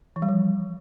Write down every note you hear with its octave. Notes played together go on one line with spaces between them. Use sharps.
E3
G3
F3